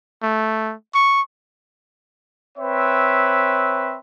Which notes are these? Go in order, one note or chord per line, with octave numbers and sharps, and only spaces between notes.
A3
C#6
C4 B4 C#5 E5